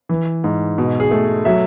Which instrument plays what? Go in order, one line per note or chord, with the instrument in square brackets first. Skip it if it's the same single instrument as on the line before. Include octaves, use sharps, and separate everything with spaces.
[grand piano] E3
G#2
B2
G#4
A3
F#3 E5